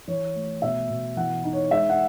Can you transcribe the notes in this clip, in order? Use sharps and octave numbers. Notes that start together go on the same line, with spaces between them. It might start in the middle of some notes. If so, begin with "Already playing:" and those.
E3 C#5
A3
B2 E5
B2
E3 F#5
D#4
C#5
G#3 E5
F#5